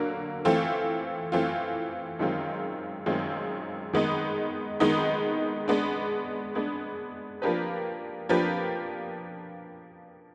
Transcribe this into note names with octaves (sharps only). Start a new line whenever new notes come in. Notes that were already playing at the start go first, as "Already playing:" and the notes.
Already playing: D3 F#3 A#3
E3 A3 C4 F4
E3 A3 C4 F4
F#2 D#3 G#3 C4 F4
F#2 D#3 G#3 C4 F4
D#3 G#3 B3 D#4
D#3 G#3 B3 D#4
G#3 B3 D4
G#3 B3 D4
F3 A#3 D4 G4 B4
F3 A#3 D4 G4 B4